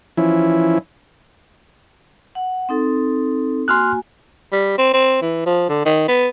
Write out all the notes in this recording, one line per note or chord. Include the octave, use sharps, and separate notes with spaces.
E3 F3 C#4 E4
F#5
C4 D#4 A4
A#3 F#4 G#5 C6 F6 F#6
G3
C4
C4
E3
F3
D3
D#3
B3